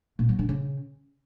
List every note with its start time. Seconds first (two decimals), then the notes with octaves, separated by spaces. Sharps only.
0.19 A#2
0.29 F#3
0.39 D3
0.49 C#3